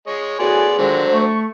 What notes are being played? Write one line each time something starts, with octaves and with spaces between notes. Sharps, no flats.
G#3 C#5 D#5
A2 B3 F#4 G#4 D5 G#5 C6
A#2 D3 D#3 F#3 G#3 C5
A3 C#6